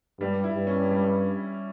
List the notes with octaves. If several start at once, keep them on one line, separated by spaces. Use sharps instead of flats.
G2 G3
E4
G2
C#4
G3